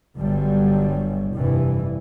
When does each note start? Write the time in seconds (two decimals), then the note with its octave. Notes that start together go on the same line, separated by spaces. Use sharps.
0.17 G1 G2 D3 F#3 G3
1.34 F1 G2 E3